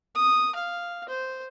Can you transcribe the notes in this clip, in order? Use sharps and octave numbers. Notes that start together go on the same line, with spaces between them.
D#6
F5
C5